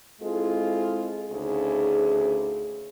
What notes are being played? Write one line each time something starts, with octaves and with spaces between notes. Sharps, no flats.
G#3 C4 E4 F4 G#4 A4
D2 C#3 D#4 G#4